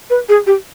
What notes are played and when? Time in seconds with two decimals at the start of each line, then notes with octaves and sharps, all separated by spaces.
0.10 B4
0.29 G#4
0.47 G4